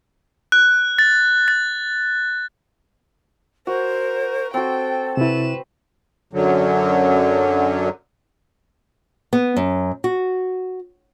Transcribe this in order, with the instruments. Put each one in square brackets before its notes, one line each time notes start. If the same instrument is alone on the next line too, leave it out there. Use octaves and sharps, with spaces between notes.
[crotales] F#6
A6
A6
[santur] F#4 [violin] A#4 [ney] C5
[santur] C4 F#4 [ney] A4 [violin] G5
[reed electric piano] C3 E4 [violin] B4 E7
[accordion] F#2 D3 F#3
[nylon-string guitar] B3
F#2
F#4